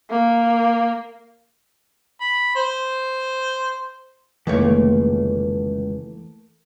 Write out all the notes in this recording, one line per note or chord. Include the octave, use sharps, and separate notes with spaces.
A#3
B5
C5
F1 C#2 D#3 E3 A3 A#3 C#5